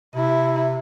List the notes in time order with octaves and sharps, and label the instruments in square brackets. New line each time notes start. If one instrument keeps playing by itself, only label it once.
[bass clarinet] C3 [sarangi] E4